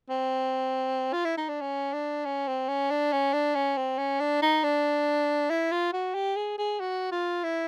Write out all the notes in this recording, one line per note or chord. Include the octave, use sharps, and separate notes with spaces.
C4
F4
E4
D#4
D4
C#4
D4
C#4
C4
C#4
D4
C#4
D4
C#4
C4
C#4
D4
D#4
D4
E4
F4
F#4
G4
G#4
G#4
F#4
F4
E4